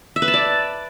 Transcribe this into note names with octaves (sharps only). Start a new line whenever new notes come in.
E5
B4
A5
D5